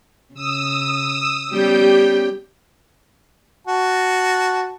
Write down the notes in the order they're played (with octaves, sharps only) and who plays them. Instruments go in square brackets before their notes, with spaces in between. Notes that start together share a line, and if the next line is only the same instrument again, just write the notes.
[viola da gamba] C#3 [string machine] D#6 E6
[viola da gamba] G3 B3 C#4 [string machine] G4 G5
[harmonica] F#4 A5